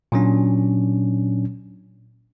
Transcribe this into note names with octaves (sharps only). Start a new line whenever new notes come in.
A#2 F#3 C#4 D4